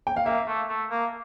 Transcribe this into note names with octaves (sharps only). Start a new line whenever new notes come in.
G5
F5
A#3 E5
A3
A3
A#3